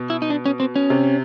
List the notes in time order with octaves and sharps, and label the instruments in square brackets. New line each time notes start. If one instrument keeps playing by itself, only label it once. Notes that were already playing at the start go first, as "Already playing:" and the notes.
Already playing: [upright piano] B2
[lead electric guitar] E4
D#4
D4
C#4
C4
C#4
[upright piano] C3